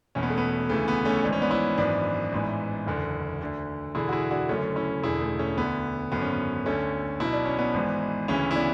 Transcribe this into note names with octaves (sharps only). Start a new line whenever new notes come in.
E1 E2 B2 C#4
B3
A3
B3
D2 C#3 E3 A3
B3
A3 C#4
G#1 G#2 E3 D4
C#4
B3 D4
C#4 E4
G#1 F#2 E3 B3 D4
A1 G#2 E3
F#1 E2 D3
D2 D3
E1 E2 D3 E4 G#4
F#4
E4 G#4
D4 F#4
F#1 F#2 D3 A3 C#4
C#4 E4
E1 E2 D3 E4 G#4
A3
A3 C#4
D2 D3 B3
G#1 F#2 D3 B3
C#4
B3
D2 D3 A3 C#4
B1 B2 E4
D4
C#4
B3 D4
G#1 G#2 E3
D2 C#3 E3 C#4 E4
E4
B3 D4